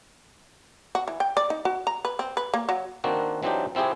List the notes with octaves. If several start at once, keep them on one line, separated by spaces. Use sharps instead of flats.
F#4
E3
G5
D5
D#4
F#4
A#5
B4
C4
B4
A#3
F#3
D#3 A#3 C4 D4 F#4
E3 F#3 C4 D4 D#4 G4
F3 C4 E4 G4 G#4